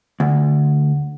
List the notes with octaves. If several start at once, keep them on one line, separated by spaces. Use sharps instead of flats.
D2